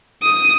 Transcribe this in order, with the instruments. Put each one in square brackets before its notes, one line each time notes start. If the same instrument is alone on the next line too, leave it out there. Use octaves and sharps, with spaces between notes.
[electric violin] D#6